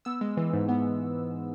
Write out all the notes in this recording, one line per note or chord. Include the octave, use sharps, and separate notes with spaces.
B3 E6
G#3
E3
G#2
B3